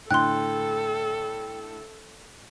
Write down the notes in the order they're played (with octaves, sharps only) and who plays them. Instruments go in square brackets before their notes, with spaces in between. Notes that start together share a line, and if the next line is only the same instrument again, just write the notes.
[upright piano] A2 D3 [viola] A4 [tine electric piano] G5 [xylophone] C6 F#6